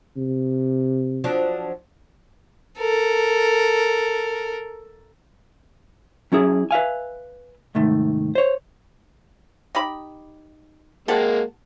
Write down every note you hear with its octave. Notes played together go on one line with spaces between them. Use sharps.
C3
F3 F#3 D4
A4 A#4
F#3 C#4 E4 G#4
B4 E5 F5 G#5
C2 G#2 D#3 A3
C5 C#5
D#4 G4 B5
G#3 A#3 G4 F#5 A5